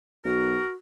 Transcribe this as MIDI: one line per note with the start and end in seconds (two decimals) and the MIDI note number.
0.25 0.58 35
0.25 0.73 66
0.25 0.68 70